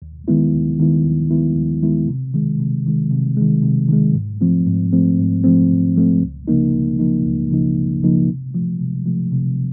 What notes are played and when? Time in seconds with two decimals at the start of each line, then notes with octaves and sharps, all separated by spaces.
0.02 D#2
0.28 D#3 G#3 B3 E4
0.53 D#2
0.79 D#3 G#3 B3 E4
1.04 D#2
1.31 D#3 G#3 B3 E4
1.56 D#2
1.83 D#3 G#3 B3 E4
2.09 C3
2.34 D#3 G#3
2.60 C3
2.86 D#3 G#3
3.11 C3
3.37 D#3 G#3
3.63 C3
3.89 D#3 G#3
4.15 G#2
4.41 F3 A3 C4
4.67 G#2
4.93 F3 A3 C4
5.19 G#2
5.44 F3 A3 C4
5.71 G#2
5.96 F3 A3 C4
6.22 C#2
6.48 C#3 F3 A#3 D#4
6.74 C#2
6.99 C#3 F3 A#3 D#4
7.25 C#2
7.51 C#3 F3 A#3 D#4
7.78 C#2
8.03 C#3 F3 A#3 D#4
8.28 C3
8.55 F3 A3
8.80 C3
9.06 F3 A3
9.32 C3